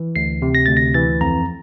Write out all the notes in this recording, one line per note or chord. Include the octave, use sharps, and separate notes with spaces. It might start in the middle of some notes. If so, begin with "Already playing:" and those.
Already playing: E3
D2 C7
C3
A#6
D2 A6
A#6
E3 A6
F2 A#5